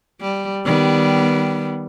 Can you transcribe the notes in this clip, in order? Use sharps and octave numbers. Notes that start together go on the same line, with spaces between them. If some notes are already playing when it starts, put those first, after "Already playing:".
G3
D#3 G3 B3